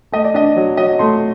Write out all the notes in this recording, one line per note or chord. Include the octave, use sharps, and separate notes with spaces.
A3 D#5
D5
D4 D#5
F#3
F#3 D#5
A3 C6